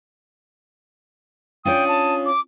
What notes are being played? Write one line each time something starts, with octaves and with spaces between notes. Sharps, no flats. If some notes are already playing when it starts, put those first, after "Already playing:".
C#4 D4 F4 G5 D#6
A5
D6